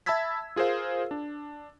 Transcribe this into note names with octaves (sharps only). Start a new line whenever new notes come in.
E5 A5 B5 E6 G#6 B6
F4 G#4 A#4 C5 F5
D4